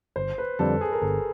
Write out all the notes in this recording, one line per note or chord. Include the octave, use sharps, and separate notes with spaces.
G1 C5
B4
F2 D3 G3 A4
G#4
A#4
G1 A4